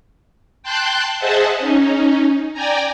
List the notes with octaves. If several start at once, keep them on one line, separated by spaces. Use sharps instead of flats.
G5 A5 C6 F#6 G6
G#4 C5 D#5 E5 F#5 A5
C#4 D#4
D5 G5 G#5 A#5